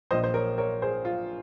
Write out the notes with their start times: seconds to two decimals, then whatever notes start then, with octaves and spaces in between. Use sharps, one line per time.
0.11 A#1 A#2 F3 C5 D#5
0.24 C5
0.34 A#4 C#5
0.58 A#4 C#5
0.82 G#4 C5
1.05 F4